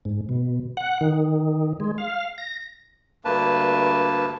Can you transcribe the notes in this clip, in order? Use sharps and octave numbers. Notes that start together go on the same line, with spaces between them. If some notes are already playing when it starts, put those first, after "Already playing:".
G#2
B2
F#5
D#3
G#3
F5
A#6
D2 G2 A#3 B4 A5